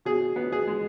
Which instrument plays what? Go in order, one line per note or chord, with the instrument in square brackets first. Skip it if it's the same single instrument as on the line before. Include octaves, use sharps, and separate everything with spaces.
[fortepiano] B2 G#4
B3
G#4
G#3